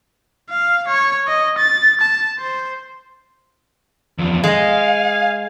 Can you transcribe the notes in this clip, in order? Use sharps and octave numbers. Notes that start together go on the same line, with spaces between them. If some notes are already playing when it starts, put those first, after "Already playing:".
F5
C#5
D#5
A6
A5
C5
E2 F3
G#3 D#5 F5 G#5